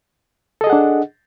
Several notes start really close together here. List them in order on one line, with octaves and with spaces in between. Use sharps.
A4 D#5 G#4 F#5 D4